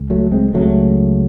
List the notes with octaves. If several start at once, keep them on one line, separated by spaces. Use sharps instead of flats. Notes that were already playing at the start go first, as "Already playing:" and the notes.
Already playing: C#2
F#3 A3
G#3 C4
C#2 C#3 F#3 A3